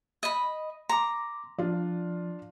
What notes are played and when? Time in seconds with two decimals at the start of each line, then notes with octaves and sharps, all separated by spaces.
0.23 D#5 B5
0.89 A#5 C6 D6
1.58 F3 D4 F4 D5